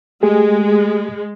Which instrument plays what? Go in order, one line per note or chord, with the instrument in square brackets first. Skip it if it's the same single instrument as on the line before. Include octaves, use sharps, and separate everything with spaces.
[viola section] G#3 [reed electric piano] A3 G4 G#4